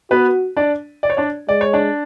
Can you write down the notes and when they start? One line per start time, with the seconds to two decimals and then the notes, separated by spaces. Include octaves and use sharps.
0.11 B3 F#4 B4
0.57 D4 D5
1.03 D5
1.10 C#5
1.17 D4 D5
1.48 G#3 D5
1.61 C#5
1.73 D4 D5